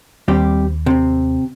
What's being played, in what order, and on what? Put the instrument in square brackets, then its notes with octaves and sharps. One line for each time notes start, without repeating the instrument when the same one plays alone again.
[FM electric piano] D#2 [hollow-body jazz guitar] G3 C4 G4
[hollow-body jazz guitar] C3 C4